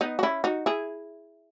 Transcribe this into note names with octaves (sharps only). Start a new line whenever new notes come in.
B3 D#4
F#4
C#4 E4
D#4 F#4
E4 G#4